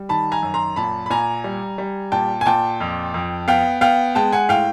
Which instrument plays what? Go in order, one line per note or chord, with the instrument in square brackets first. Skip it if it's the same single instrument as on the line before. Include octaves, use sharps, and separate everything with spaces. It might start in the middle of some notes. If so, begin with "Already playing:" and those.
Already playing: [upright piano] G3
D#3 A5 B5
G#5 A#5
F#2
A#5 C6
A#2 A5 B5
B5
A#2 G#5 A#5
G3
G3
A#2 G5 A5
G#5
A#2 G5 A5
F2
F2
B3 F5 G5
B3 F5 G5
G#3 G5 A5
F#5 G#5
A2 F5 G5